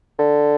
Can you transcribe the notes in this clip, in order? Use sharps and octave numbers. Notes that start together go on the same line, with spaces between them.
D3